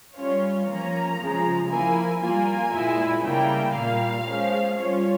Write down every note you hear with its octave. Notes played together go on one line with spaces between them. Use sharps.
G3 C#4 F4 C#5
F3 A#3 C#4 A#5
C#3 F3 G#3
F3 A#3 E4 G#5
G3 A#3 F4 G#5
A#2 G#3 E4
C#3 G3 A#3 E4 G5
A#2 G3 A#3 F5
F3 G#3 C#4
G3 C#4 F4 C#5